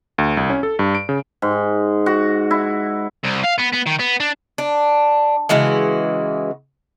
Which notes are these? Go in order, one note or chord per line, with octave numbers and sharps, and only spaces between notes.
D2
C2
C#4
A4
G2
D7
C#3
G#2
F#4
E4
C2
F5
B3
B3
D#3
B3
D4
D4
C#3 E3 G#3 F#4